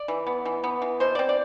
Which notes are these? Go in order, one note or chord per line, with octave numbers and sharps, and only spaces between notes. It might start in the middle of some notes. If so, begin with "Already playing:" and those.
Already playing: D5
E3
B3
E3
B3
E3
B2 C5
C4 D5
D5